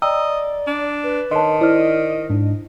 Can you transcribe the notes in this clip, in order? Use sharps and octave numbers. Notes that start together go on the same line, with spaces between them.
D5 D#5 G5 A#5 E6
D4
B4
D#3 C#5 D#5 A5 C6
E4 C5 D5 D#5 F6
G#2 D4